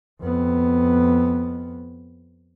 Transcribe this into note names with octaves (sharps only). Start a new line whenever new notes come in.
F2 B3